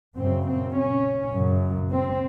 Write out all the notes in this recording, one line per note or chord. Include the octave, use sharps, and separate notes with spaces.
F#2 C#3 C4
C4
C#4
F#2 C#3
C4